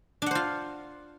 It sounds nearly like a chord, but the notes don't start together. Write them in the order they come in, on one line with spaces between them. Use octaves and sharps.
D4 F#5 C5 F4